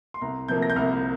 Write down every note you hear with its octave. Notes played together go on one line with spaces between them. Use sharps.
C6
C2 A#5
C3 F3 A#3 G6
A#6
G6
C2 F6